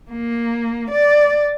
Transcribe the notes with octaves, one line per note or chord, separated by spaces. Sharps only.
A#3
D5